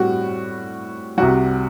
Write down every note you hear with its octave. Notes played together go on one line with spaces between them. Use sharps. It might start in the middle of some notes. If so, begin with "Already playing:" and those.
Already playing: A2 G3 C4 F#4
C2 C3 G3 F#4